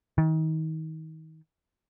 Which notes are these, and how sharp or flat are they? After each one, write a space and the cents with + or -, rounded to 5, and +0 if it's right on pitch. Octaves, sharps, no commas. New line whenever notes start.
D#3 +30